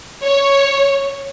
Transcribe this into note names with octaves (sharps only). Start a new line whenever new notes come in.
C#5